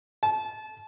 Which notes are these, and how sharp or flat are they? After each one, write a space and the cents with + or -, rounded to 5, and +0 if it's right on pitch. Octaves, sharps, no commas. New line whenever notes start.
A5 -25